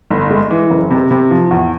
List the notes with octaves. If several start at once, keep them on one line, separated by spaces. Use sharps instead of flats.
G1
G#3
E3
F#1
C3
C3
F3
E2